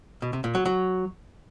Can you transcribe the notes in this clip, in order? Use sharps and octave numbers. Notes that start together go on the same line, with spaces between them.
B2
C3
A#2
F#3
F#3